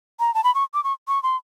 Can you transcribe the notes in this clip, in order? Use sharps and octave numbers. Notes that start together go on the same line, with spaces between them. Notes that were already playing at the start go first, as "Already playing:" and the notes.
A#5
A5
B5
C#6
D6
C#6
C#6
C6